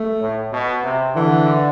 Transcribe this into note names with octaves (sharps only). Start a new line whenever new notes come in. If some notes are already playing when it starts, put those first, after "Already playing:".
Already playing: A3
A2
B2
C3
D3 E3